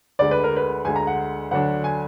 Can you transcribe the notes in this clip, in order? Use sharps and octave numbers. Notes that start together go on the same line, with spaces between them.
D2 D3 G#3 D5
B4
A#4
B4
D2 D3 G#3 G#5
A#5
F#5
D2 D3 F#3 D4 F#5
G#5